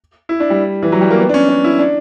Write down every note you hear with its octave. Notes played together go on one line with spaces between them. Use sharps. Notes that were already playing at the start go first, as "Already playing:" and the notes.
E4
D4
G3
E3
F#3
G3
A#3
B3
D4
C#4
D4
E4
D4